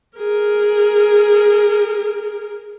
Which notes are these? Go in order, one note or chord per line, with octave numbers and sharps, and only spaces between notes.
G#4 A#4